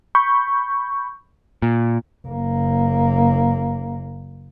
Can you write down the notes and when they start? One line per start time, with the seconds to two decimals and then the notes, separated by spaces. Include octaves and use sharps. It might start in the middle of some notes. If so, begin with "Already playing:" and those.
0.15 B5 C#6 G6
1.62 A#2
2.27 F#1 A#3